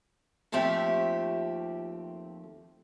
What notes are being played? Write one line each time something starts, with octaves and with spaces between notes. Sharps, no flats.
D#2 F3 A3 C4 G4 E5